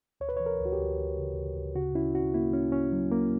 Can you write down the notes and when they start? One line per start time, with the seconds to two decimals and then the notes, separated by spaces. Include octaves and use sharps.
0.20 D2 C#5
0.29 B4
0.37 E3 C#5
0.46 A#4
0.59 D2
0.65 F#4
0.72 G4
0.79 D2
0.98 D2
1.18 C#3
1.37 D2
1.56 D2
1.75 C#3 F#4
1.95 C#4 E4
2.14 C#4 F#4
2.34 A#3 E4
2.53 C#4
2.72 C#4
2.92 F#3
3.12 A#3